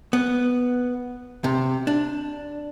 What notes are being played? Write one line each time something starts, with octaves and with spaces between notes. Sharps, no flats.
B3
C3
D4